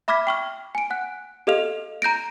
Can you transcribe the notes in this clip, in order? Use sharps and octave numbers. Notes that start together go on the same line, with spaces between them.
E5 B5 D6 F6 G#6 B6
G5 C#6 F6
G#5 D7
F#5 F#6
G4 A4 D#5 F5 F6 F7
A#5 G6 A#6 D7